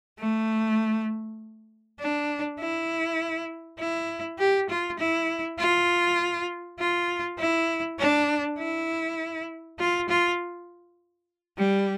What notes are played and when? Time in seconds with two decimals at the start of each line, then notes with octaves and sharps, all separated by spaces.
0.20 A3
1.99 D4
2.59 E4
3.79 E4
4.39 G4
4.70 F4
4.99 E4
5.60 F4
6.80 F4
7.39 E4
7.99 D4
8.59 E4
9.79 F4
10.09 F4
11.58 G3